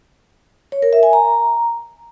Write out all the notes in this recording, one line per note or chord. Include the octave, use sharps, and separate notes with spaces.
C#5
A#4
E5
G#5
A#5